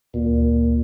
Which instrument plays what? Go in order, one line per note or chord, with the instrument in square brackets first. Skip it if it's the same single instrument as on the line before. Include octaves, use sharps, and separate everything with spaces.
[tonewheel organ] D2 [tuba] A#2